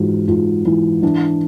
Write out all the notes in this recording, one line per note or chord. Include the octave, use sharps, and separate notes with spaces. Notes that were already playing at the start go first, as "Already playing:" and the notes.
Already playing: G#2 E3 F4 F#4
G#2 F4
E3 E4
E3 D4